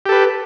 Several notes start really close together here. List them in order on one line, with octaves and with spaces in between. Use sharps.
G4 A4 B4